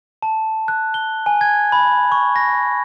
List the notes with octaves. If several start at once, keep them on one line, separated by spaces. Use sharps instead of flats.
A5
F#6
G7
G#5
G#6
B5
C#6
A#6